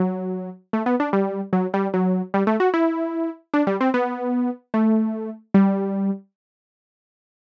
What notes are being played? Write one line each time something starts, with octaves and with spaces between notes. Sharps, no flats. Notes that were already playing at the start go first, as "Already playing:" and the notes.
Already playing: F#3
A3
B3
D4
G3
F#3
G3
F#3
G3
A3
F#4
E4
D4
G3
C4
B3
A3
G3